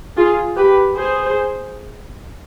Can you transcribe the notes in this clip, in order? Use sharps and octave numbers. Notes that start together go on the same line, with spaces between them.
F4 G#4
G4 B4
G#4 C5